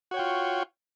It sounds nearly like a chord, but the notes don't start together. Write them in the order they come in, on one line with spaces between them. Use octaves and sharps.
F#4 C#5 G5 F4